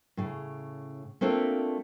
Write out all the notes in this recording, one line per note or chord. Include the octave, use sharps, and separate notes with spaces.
A2 C#3
A3 A#3 C4 D4 F4